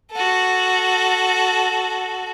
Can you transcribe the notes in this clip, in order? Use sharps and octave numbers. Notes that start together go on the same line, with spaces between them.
F#4 A4